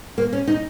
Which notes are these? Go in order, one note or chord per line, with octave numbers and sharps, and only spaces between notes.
A#3
C#4
D#4